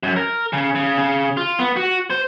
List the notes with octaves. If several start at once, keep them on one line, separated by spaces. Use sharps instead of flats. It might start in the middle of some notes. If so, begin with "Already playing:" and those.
F#2
A#4
C#3
C#3
C#3
F4
B3
F#4
C5